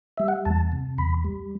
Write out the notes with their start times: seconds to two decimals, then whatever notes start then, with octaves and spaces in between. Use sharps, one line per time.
0.18 G3 E5
0.28 F#5
0.45 E2 A5
0.72 C3
0.98 E2 B5
1.24 G3